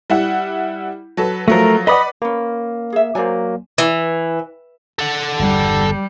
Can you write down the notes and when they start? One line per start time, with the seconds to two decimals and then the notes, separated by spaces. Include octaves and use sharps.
0.10 G3 E4 F#5
1.17 F#3 A4 B4
1.48 F3 F#3 A3 A#4 A#6
1.87 B4 D5 D#5 F#5 B5 D#6
2.22 A#3 C#4 B4
2.92 G#4 E5
3.15 F#3 A#3 C5 D5 G#5
3.78 E3
4.99 A4 F#5
5.39 G1 E2 G3